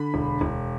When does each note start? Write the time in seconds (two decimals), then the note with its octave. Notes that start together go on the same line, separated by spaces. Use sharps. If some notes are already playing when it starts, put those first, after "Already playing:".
Already playing: D3 B5
0.14 E1
0.41 E1